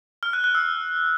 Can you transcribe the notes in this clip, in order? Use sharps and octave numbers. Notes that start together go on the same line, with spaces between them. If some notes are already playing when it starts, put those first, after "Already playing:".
F6
F#6
F#6
E6